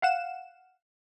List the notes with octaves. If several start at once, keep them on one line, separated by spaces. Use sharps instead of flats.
F5 F#5 E7